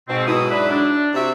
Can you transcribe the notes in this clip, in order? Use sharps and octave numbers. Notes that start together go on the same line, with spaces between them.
G#2 B2 C4
G#2 B2 F#3 E4 D#6
D4 G#4 B4
D4
C3 F#4 E5